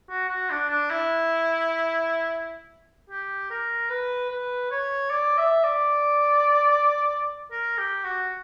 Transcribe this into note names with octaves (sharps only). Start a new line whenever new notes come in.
F#4
F#4
D4
D4
E4
G4
A#4
B4
B4
C#5
D5
E5
D5
A#4
G4
F#4